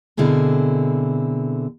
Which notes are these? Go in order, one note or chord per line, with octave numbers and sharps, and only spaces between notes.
B2 D3 C4 E4 G#4 A#4